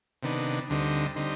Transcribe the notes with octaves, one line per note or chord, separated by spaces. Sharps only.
C3 D#3 B3 D4
D2 D3 G3 C4 D#4
D3 G3 C4 D#4